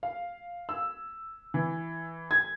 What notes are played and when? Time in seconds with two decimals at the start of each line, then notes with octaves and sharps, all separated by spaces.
0.03 F5
0.69 E6
1.54 E3
2.31 G#6